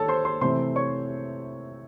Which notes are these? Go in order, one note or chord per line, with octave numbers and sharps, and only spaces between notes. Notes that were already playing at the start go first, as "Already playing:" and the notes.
Already playing: D#3 A4 C#5 A5
C5 C6
C5 C6
C3 E3 A3 C5 C6
C#5 C#6